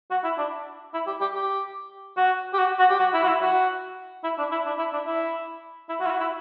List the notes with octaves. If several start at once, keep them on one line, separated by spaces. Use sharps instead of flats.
F#4
E4
D4
E4
G4
G4
G4
F#4
G4
F#4
F#4
G4
F#4
E4
F#4
E4
F#4
E4
D4
E4
D4
E4
D4
E4
E4
F#4
E4
F#4
E4